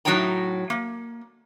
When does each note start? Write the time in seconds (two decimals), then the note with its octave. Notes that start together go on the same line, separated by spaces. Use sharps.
0.05 A2 F#3 D#4 C#5 G5 A#5
0.70 A#3